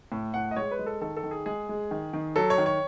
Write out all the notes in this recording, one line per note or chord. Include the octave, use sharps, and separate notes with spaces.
A2
A2 F#5
D#5
G#3 C#5
B4
G#3
A4
D#3 A4
A4
D#3
G#4
G#3 G#4
G#3
D#3
D#3
F#3 A4
C#5
D#3
C#5